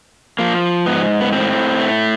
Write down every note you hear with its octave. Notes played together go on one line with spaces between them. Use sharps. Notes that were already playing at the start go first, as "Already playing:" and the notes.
F3 A#3
G#2 B3
B3
A2 C4
A3